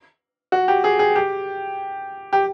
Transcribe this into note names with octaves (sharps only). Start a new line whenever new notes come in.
F#4
G4
G#4
G#4
G4
G4